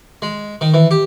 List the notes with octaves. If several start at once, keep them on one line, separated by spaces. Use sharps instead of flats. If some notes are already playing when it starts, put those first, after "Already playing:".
G#3
D#3
E3
G4